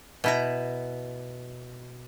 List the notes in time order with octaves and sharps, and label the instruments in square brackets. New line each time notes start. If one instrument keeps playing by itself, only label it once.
[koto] B2 E4 A#5